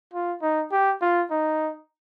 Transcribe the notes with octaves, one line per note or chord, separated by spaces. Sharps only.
F4
D#4
G4
F4
D#4